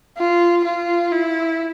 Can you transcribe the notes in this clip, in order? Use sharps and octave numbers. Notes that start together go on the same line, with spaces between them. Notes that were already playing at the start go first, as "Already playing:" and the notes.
F4
F4
E4